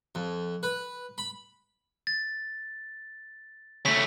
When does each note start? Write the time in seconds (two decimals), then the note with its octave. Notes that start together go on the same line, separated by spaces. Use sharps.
0.15 F2
0.63 B4
1.18 B5
2.07 A6
3.86 C#3 A3 B6